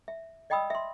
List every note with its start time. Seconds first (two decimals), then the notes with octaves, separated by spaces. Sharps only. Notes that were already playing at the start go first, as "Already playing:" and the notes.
0.08 E5
0.50 D5 D#5 G5 B5 D#6 E6
0.70 E5 C6